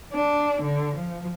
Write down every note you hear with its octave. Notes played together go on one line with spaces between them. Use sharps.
D4
D3
F3